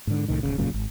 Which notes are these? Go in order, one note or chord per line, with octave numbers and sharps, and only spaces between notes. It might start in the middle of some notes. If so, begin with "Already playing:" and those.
G#2 D3
C2 A2 D#3
D1 A#1 C#3
E1 F#2 A#2 C#3
G#1